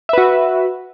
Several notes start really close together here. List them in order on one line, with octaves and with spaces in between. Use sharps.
E5 B4 F#4